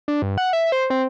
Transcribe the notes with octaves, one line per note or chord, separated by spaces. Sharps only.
D4
G2
F#5
E5
C5
C4